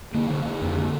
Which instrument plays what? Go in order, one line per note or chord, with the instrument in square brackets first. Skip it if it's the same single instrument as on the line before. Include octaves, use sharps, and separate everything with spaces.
[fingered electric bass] D3 A#3
D3
D3
F2
D3